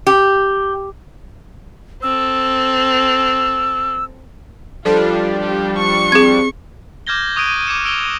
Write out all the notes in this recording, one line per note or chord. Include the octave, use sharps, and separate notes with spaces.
G4
C4 A4 E6
F3 G3 D4 F4 A4
G4
C#6 C#7
C4 G#4 G#6
D6 F6 G6 G#6 A#6 G7
C#6 D#6 F#6 G#6 D7 D#7
D6 G#6 C#7 E7
E6 D7 F7 G7